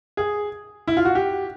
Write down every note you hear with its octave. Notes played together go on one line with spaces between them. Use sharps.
G#4
E4
F4
F#4
G4